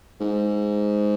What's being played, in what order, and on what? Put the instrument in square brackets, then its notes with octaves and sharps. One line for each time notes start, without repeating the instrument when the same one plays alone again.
[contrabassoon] G#2